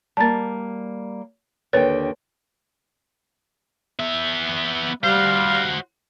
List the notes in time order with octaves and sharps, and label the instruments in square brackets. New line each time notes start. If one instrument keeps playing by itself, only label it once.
[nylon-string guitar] G3 A#3 [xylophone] A5 A#5 A6
[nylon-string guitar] D#2 D3 G5 [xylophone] B4 C#5 A6
[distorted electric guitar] B3 E5
[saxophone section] G3 F5 [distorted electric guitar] F#4 C5